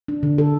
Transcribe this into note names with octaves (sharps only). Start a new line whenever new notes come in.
D4
D3
A4